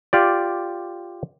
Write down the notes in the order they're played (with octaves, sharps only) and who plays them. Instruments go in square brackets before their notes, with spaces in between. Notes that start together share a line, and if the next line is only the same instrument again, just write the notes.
[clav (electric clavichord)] F4 G4 D5